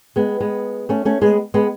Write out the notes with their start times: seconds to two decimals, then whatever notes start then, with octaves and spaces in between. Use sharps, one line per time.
0.16 G#3 B3
0.40 G#3 B3
0.89 A3 C#4
1.05 A3 C#4
1.22 G#3 B3
1.54 G#3 B3